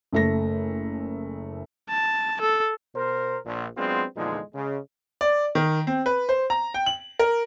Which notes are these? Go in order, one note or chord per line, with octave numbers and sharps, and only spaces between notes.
F#1 A3 A#6
A5
A4
B2 A#4 C5
A#1
F#3 G#3 B3 C4 D4 F4
E2 A#2 D3 F3 G#3 D#4
C#3 G#3
D5
D#3
C4
B4
C5
A#5
G5
F#7
A#4